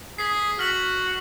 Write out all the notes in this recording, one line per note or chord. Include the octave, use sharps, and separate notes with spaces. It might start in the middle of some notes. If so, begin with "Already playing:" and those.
G#4 B6 C7
F#4 F6 B6 F#7